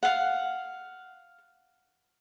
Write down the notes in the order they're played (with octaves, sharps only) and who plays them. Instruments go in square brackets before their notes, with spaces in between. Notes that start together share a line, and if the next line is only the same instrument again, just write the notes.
[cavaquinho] F5 F#5